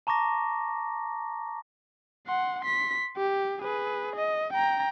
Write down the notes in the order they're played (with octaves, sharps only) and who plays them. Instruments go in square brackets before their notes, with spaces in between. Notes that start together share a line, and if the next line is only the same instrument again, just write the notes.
[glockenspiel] A5 A#5 C#6 D6 A#6
[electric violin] F#5 C6
C6 B6
G4
G#4 B4
D#5
G5 A#5